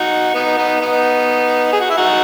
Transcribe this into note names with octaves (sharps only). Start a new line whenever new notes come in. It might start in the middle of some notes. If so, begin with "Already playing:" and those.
Already playing: D#4 F#4
B3 D#4
B3 D#4
B3 D#4
G#4
F#4
E4
D#4 F#4